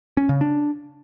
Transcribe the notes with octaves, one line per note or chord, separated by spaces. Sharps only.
C#4
C#3
D4